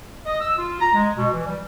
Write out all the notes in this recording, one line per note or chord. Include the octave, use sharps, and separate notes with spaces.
D#5
E6
F4
A#5
G#3
B2
E3
G3